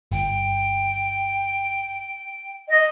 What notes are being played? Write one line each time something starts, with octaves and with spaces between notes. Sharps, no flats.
G1 G5
D#5